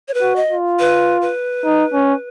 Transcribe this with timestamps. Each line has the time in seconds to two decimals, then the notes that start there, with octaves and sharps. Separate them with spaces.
0.08 C#5
0.14 B4
0.21 F#4
0.36 D#5
0.50 F4
0.79 B4
1.21 B4
1.65 D#4
1.94 C#4